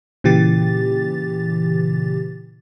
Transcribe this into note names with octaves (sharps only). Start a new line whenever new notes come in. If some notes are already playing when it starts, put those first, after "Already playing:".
A#2 C#3 E3 G4 A6